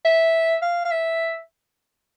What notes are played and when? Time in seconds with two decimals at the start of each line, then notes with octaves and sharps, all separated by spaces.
0.05 E5
0.62 F5
0.85 F5
0.91 E5